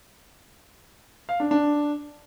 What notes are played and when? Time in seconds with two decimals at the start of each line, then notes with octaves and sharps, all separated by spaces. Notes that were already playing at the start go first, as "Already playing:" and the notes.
1.29 F5
1.40 D4
1.51 D4